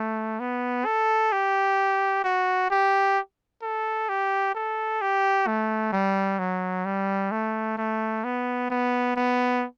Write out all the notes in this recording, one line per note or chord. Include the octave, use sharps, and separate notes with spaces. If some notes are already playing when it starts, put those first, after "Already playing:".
Already playing: A3
B3
A4
G4
F#4
G4
A4
G4
A4
G4
A3
G3
F#3
G3
A3
A3
B3
B3
B3